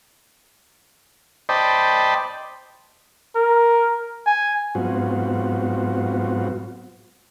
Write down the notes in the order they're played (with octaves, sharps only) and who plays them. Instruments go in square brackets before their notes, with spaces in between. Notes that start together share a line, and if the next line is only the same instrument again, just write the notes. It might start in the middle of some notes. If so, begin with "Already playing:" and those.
[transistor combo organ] C5 D5 D#5 G5 A5 B5
[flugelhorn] A#4
G#5
[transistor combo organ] G#2 F#3 B3 C4 F4 F#4